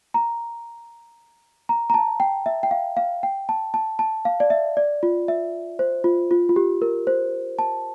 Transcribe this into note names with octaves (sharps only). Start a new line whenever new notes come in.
A#5
A#5
A#5
A5
G5
E5
G5
F5
F5
G5
A5
A5
A5
F5
D5
E5
D5
F4
E5
C5
F4
F4
F4
G4
A#4
C5
A5